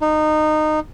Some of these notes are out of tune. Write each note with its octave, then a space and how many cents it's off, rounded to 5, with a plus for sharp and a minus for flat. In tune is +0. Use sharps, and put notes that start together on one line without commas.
D#4 -20